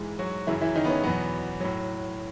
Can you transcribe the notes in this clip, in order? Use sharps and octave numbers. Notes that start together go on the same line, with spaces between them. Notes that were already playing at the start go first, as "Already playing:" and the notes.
Already playing: G#2 E3 G#3
F#3 F#4
F#2 C#3 E3 F#3 E4
E3 E4
D#3 D#4
B3
C#4
E2 B2 F#3 B3
A2 F#3